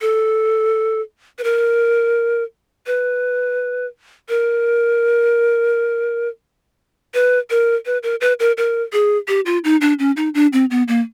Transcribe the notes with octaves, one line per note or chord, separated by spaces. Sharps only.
A4
B4
A#4
B4
A#4
B4
A#4
B4
A#4
B4
A#4
A#4
G#4
G4
F4
D#4
D4
C#4
D#4
D4
C4
B3
A#3